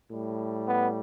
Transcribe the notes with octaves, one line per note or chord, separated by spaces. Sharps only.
A2 G3
B3